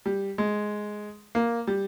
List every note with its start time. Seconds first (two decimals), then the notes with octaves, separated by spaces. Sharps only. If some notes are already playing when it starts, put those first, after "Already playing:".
0.06 G3
0.38 G#3
1.35 A#3
1.67 G3